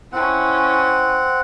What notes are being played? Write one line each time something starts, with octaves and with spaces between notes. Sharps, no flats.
C4 C#4 E4 F#5